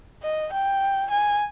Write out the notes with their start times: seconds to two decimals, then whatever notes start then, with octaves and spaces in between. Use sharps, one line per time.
0.23 D#5
0.53 G5
1.11 G#5